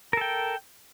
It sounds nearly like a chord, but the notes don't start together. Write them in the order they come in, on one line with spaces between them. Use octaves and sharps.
A#4 A4 G5